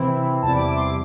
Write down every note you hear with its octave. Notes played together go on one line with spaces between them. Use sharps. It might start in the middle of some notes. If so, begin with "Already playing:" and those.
Already playing: C3 E3 C4 E4
E2 C3 G3 E4 A5
D6
D6
C6
D6